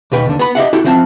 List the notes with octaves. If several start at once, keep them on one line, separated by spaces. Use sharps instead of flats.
D#2 B2 B4 G5
D#2 D3
B3 B5
G4 D#5 E5 F#5
E4 F#4 G4 A4
E3 F3 C4 F#5 A5